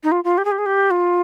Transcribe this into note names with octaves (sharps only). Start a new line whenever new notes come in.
D#4
F4
F4
G4
G#4
G4
G#4
G4
F4